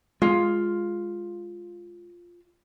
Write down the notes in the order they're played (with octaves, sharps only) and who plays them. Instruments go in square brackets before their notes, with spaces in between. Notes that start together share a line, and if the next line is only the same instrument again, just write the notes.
[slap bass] G#3 [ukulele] F4